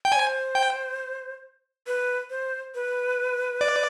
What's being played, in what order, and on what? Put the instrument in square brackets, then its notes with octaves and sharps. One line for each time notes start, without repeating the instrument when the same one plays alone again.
[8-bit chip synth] G5
[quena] C5 D5 [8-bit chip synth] G#5
[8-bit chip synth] G5
[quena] B4
C5
B4
[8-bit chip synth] D5